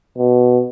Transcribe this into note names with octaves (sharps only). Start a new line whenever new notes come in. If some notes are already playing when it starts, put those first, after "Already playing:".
B2